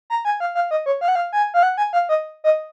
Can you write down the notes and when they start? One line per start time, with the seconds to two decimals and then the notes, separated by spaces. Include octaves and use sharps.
0.10 A#5
0.25 G#5
0.40 F5
0.55 F5
0.71 D#5
0.86 C#5
1.01 F5
1.08 F#5
1.15 F5
1.33 G#5
1.54 F5
1.63 F#5
1.77 G#5
1.93 F5
2.09 D#5
2.44 D#5